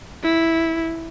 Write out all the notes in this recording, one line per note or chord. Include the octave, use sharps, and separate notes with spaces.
E4